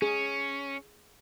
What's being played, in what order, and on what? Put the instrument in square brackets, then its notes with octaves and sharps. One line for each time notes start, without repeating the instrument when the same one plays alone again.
[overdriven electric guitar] C#4 [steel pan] G#4